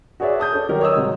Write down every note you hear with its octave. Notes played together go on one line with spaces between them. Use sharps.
F#4 G#4 B4 C#5 D5 E5
A5 D#6 G6
C#4 D4 A4
D#3 F#3 C#4 G4 A#4
C#5 D#5 D#6 E6
G#2 C3 F#3